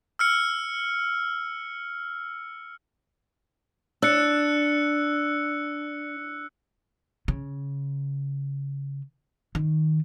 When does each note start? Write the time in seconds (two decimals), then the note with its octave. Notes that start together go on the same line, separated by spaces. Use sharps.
0.19 E6 F6 C#7
4.02 D4 E6 F#6 C#7
7.28 C#3
9.55 D#3